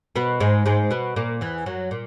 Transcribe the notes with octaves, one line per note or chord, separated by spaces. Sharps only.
B2 B3
G#2 G#3
G#2 G#3
B2 B3
A#2 A#3
E2 E3
F#2 F#3
A#2